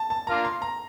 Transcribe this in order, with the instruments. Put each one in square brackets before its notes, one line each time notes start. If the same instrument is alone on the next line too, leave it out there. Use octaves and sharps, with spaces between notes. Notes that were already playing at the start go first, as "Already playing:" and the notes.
Already playing: [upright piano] A5
A5
[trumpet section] A#3 D4 F4 A#4 F5 [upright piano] A#5
[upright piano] C6
A#5